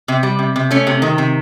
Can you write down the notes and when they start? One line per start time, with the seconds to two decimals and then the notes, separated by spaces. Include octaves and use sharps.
0.08 C3
0.23 G3
0.39 C3
0.56 C3
0.71 A3 C#4
0.87 C3
1.02 D#3
1.18 C3